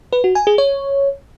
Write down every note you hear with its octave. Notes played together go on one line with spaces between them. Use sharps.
B4
F#4
G#5
G#4
C#5